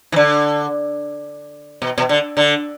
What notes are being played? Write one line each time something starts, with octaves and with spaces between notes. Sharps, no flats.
E3
D3
B2
B2
D3
D3